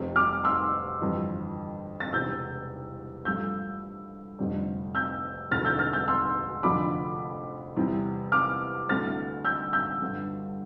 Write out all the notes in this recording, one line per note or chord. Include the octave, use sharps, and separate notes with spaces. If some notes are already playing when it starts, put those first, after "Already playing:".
Already playing: F1 F2 C3
D6 F6
C6 E6
G1 F2 E3 G3
A6
E1 E2 C3 E6 G6
G2 F3 A3 E6 G6
F1 F2 D3 G3
E6 G6
E1 D2 D3 A3 E4 F6 A6
E6 G6
F6 A6
E6 G6
C6 E6
F1 F2 D3 F3 B5 D6
E2 C3 G3 C4 E4
D6 F6
D2 D3 A3 C4 E4 F6 A6
E6 G6
E6 G6
G1 G2 D3